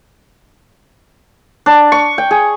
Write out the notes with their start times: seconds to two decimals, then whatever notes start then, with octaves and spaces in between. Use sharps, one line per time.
1.66 D4
1.92 C#6
2.18 G5
2.31 G#4